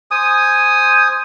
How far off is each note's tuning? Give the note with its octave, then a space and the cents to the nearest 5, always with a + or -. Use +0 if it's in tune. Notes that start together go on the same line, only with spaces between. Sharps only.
C5 +0 G#5 +0 D#6 +0